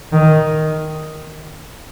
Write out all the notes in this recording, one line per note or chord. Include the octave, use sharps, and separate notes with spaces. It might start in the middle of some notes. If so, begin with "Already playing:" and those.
D#3